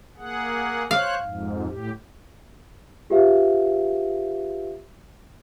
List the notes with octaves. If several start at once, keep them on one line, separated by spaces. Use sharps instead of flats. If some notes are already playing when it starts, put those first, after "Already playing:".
A#3 G#4 F#5
C5 C#5 F5 F#6
F2 G#2
A2 G4
F4 G4 G#4 B4 E5 F5